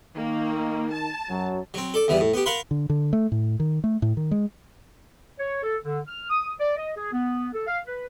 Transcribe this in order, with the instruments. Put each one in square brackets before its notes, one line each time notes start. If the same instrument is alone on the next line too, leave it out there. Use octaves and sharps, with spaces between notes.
[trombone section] D#3 [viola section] A#3
[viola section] A5
[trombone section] F#2 F#3
[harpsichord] F#3 C4
A4 D5
E2 E3 G3
A2
B3 G4
A#4 F5 F#5 B5 C6
[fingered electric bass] D3
D3
A3
A2
D#3
A3
A2
D#3
G#3
[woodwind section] C#5
A4
D3
F6
D#6
D5
D#5
G#4
B3
A4
F5
B4